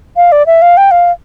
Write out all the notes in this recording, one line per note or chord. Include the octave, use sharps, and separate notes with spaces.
F5
D5
E5
F5
G5
F5